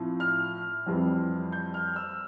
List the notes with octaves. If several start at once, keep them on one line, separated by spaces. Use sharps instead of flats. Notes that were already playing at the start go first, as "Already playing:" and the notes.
Already playing: A2 F3 C4
F6
F2 E3 G3 C4
G6
F6
E6